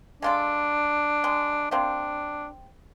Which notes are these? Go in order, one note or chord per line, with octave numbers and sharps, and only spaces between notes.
G#3 D4 F4 A4
G#3
C3 A#3 C4 D4